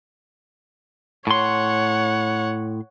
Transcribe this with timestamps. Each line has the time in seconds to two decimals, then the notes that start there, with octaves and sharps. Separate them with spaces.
1.27 A2 C#5 F#5 C6